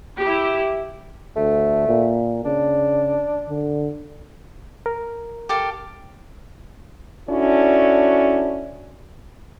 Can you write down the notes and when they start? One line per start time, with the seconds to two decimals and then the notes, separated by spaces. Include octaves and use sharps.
0.17 E4 G4
1.36 D2 A3
1.87 A#2
2.45 C#3 D4
3.49 D3
4.86 A#4
5.49 G4 A4 F5
7.28 C#4 D4 E4 F#4 A4 D5